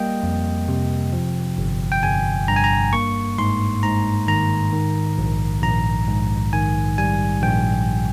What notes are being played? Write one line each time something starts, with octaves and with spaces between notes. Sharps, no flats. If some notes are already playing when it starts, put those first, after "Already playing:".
Already playing: G3 A#3 D#5 G5
F2
C3
F3
G1
G5
G1 G#5
G2 A#5
G#5
A#5
A#3 C#6
G#2 C6
G#2 A#5
D#3 A#5
D#3
A#1
A#1 A#5
G#2
D#3 G#5
G3 G#5
A#1 G5